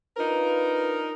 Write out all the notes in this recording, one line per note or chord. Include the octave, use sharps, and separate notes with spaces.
D4 D#4 F4 A#4 B4